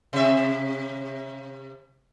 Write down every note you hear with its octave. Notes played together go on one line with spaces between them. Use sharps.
C3 E5